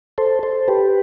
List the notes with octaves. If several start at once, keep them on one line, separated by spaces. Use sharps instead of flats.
A4 C5
A4 C5
G4 B4